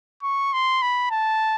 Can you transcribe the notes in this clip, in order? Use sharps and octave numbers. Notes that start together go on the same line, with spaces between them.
C#6
C6
B5
A5